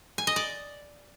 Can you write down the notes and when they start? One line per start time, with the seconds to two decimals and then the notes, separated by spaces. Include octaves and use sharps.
0.18 G#5
0.27 D#5
0.36 D5